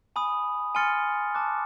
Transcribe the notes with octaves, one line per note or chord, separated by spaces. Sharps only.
G#5 B5 D#6
G#5 C6 F6 A6 C#7
A5 D6 F#6